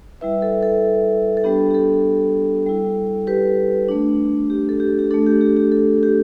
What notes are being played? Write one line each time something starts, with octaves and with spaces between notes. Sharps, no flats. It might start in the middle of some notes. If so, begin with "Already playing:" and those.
G3 E4 B4 E5
A4
A4
A4
G3 B3 D4 G4
G4
A4
G3 E4
G4 B4
A3 D4
G4
A4
G4
G4
A3 D4 A4
G4
G4
G4
A4
G4